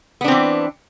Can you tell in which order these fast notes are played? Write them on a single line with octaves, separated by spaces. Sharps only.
B3 D4 C4 E3